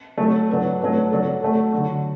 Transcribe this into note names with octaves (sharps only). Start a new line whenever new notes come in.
F#3 A3 F#4 A4
F#3 D4 B4
F#3 A3 D4 F#4 B4
F#3 D4 A4
A3 F#4 A4
D3 F#3 D4 F#4